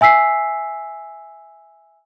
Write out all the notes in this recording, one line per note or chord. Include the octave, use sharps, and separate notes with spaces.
E5 G#5 E6 B6 C7